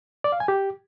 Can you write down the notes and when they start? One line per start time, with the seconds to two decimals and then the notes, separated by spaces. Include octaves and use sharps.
0.24 D5
0.32 F5
0.40 G#5
0.48 G4